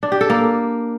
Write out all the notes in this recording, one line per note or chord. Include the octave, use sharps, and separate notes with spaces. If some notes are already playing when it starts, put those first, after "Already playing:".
D4
G4
A4
A#3